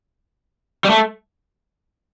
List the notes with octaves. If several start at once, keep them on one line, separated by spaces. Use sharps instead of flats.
G3
A3